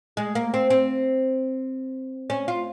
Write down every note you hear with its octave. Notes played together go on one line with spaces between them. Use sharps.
G#3
A#3
C4
C4
C#4
F4